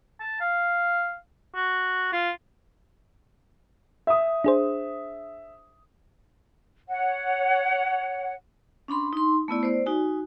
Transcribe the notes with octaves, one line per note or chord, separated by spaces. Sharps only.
A5
F5
F#4
F4
E5 D#6
D4 G#4 C5
C#5 F#5
C#4 D4 B5 C6
D#4 C6
A3 B3 E4 D5
C5 D5
D#4 F#4 G#5